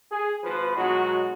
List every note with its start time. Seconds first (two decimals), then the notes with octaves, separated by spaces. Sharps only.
0.11 G#4
0.44 G#1 F3 B4
0.76 B2 F#3 G#3 D#4 F#4